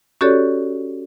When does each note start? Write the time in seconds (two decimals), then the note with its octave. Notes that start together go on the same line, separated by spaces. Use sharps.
0.21 C#4 F#4 G4 A4 C#5 D5